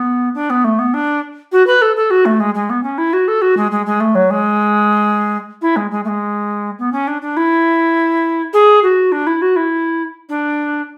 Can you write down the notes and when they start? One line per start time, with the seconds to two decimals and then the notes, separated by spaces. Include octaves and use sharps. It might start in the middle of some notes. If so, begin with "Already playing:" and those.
Already playing: B3
0.35 D4
0.50 B3
0.64 A3
0.79 B3
0.94 D4
1.52 F#4
1.67 B4
1.82 A4
1.96 A4
2.11 F#4
2.26 A3
2.40 G#3
2.55 G#3
2.70 B3
2.83 C#4
2.98 E4
3.13 F#4
3.28 A4
3.42 F#4
3.57 G#3
3.71 G#3
3.86 G#3
4.00 A3
4.15 F#3
4.30 G#3
5.62 E4
5.76 G#3
5.91 G#3
6.05 A3
6.08 G#3
6.79 B3
6.92 C#4
7.08 D4
7.22 D4
7.37 E4
8.53 G#4
8.83 F#4
9.12 D4
9.27 E4
9.42 F#4
9.56 E4
10.29 D4